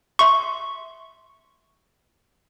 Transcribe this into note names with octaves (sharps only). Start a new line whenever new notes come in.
E5 C6 C#6